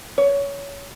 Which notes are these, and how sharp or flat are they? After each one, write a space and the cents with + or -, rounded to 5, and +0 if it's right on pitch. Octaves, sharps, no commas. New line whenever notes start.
C#5 +20